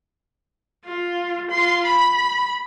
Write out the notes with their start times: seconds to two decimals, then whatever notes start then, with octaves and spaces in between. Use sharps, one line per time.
0.85 F4
1.51 F4 C6
1.85 B5